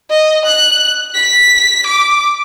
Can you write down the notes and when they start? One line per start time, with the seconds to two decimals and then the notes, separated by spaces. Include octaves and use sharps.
0.11 D#5
0.45 F#6
1.15 B6
1.87 D6